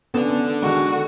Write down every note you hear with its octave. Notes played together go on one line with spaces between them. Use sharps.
B3 C#4 A4 D5
D#3 G#3 F#4